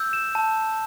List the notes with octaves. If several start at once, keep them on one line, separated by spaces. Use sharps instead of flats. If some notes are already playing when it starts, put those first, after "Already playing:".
Already playing: E6 G6
E7
A5